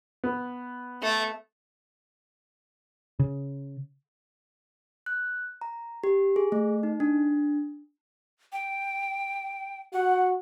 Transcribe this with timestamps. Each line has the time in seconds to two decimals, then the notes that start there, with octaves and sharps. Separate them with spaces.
0.24 B3
1.02 A3 E5
3.19 C#3
5.06 F#6
5.61 A#5
6.04 G4
6.36 G#4
6.52 A3
6.83 D#4
7.00 D4
8.53 G5
9.93 F#4 F#5